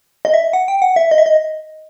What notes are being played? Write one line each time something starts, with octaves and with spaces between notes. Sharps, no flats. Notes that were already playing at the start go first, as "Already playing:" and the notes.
D#5
E5
F#5
G5
F#5
E5
D#5
E5
D#5